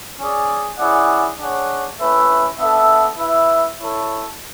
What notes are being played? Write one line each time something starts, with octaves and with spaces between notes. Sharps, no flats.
C#4 G#4 D5
C#4 E4 G#4 D5 F#5
D4 G#4 C#5 F#5
A3 C#4 E4 B4 E5
B3 D4 A4 E5
E4 B4 E5
E4 A4 C#5